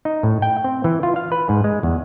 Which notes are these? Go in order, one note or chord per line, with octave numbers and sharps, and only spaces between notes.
D#4
A2
G5
C4
E3
F4
F5
B4
G#2
G#3
E2